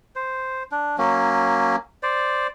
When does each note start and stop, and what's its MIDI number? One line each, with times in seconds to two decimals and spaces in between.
0.16 0.63 72
0.72 0.96 62
0.98 1.76 54
0.98 1.76 58
0.98 1.76 61
2.03 2.47 72
2.03 2.47 74